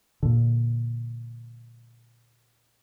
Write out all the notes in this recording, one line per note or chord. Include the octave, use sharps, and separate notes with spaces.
A#2 D3